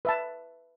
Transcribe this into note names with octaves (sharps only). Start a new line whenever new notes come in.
B4 E5 A5